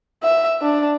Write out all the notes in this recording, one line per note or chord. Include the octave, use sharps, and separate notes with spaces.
E5
D4